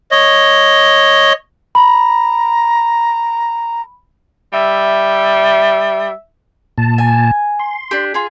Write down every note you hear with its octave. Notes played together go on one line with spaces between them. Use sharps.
C#5 D#5
A#5 B5
G3 E5
A#2 A5
G#5
C6
D4 G4
F4 G#4